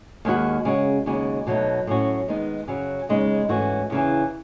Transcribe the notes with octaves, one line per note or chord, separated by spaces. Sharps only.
D#2 D#3 G#3 D#4 F#4
C#3 G#3 C#4 F#4
D#2 C#3 G#3 D#4 F#4
B2 F#3 A3 D#4
A2 F#3 C#4 F#4
D#3 G#3 B3 D#4
F#2 C#3 F#3
D#2 C#3 G#3 D#4
G#2 E3 A3 C#4 F#4
E2 C#3 E3